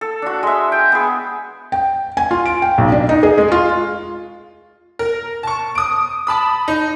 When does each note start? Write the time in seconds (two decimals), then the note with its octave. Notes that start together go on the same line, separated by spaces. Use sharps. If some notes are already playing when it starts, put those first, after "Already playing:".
0.01 A4
0.22 D4 F#4
0.43 G#3 E5
0.72 G5
0.92 B3 G#4
1.72 G5
2.17 G#5
2.31 F4
2.46 D7
2.62 G5
2.78 B1
2.92 D4
3.09 D#4
3.23 G#4
3.38 G#3
3.52 F4
4.99 A#4
5.43 A5 C#6
5.75 D#6 D7
6.27 A5 B5 D#6
6.68 D#4